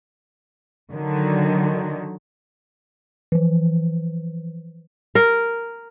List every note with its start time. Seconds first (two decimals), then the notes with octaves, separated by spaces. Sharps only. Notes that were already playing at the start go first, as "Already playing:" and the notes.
0.92 D3 D#3 F#3
3.32 E3 F3
5.15 A#4